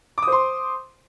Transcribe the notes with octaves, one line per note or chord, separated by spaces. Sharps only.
C5 C6 D6 D#6